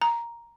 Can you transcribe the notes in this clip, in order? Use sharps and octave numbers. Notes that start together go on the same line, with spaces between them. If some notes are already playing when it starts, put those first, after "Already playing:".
A#5